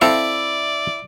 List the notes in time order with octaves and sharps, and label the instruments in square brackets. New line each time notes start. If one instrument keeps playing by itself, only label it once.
[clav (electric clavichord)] C4 A4 F5 [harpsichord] E4 [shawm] D5